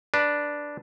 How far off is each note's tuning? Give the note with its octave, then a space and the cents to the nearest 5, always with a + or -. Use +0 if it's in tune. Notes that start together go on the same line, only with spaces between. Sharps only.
D4 +0 B4 -15